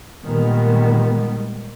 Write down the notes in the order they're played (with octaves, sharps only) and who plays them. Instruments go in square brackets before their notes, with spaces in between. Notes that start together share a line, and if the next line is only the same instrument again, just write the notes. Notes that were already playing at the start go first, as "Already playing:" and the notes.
[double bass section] A#2 D#3 G3 G#3 B3